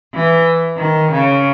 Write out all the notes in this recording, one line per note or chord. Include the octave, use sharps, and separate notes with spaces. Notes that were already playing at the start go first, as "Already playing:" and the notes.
E3
D#3
C#3